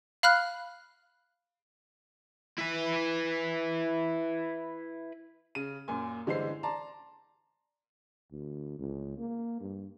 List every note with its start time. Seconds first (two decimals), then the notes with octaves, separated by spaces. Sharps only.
0.23 F5 B5 F6 F#6
2.58 E4 B4
5.55 C#3 D#7
5.88 F#2 A#2 G#5
6.26 G2 D3 E3 G#3 C5 C7
6.63 D5 A5 A#5 C6
8.32 D2
8.79 C#2
9.18 A#3
9.61 G2